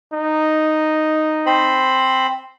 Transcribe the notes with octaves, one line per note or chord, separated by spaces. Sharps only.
D#4
C4 C5 B5